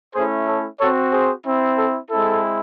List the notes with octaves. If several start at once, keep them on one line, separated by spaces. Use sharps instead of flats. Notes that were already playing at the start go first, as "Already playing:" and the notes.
A3 C#4 E4 G#4 C5
A4 C#5
C4 F#4 A4 C#5
G#4 C5
C4 E4
A4
G#3 C4 E4 A4